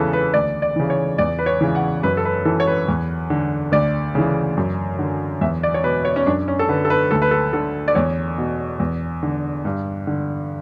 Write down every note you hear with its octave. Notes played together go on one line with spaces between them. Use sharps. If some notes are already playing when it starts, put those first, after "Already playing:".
Already playing: E2 C#3 E3 A4 B4
B4
D2 D5
D5
C#3 E3
C#5
E2 D5
B4
C#5
C#3 E3
F#5
F#2 B4
A4
B4
E3 A4
C#5
B4
E2
D3
D2 D5
C#3 E3
F#2
D3
E2 E5
D5
C#5
B2 B4
C#5
C#4
F#2 D4
C#4
A4
D3 B4
A4
B4
D2 A4
B4
A4
D3 A4
D5
E2 C#5
B2
E2
D3
G2
D3